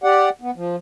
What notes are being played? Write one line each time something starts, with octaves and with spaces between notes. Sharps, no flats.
G4 D5 F#5
B3
F3